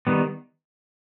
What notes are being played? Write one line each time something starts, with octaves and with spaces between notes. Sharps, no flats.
D#3 G3 B3